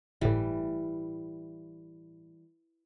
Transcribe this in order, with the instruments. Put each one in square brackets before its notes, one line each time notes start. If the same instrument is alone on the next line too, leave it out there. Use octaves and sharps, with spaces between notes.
[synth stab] G1 A2 [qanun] E3 G3